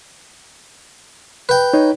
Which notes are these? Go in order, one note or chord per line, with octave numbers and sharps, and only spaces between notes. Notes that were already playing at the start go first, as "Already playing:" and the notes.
B4 G5
D#4 C#5